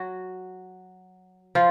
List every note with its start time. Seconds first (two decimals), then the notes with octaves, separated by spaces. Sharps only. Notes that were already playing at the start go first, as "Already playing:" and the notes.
Already playing: F#3 F#4
1.55 F3 F4